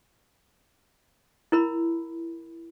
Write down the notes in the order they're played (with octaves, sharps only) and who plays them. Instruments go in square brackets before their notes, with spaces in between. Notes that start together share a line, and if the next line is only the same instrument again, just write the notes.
[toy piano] E4 A#4 B5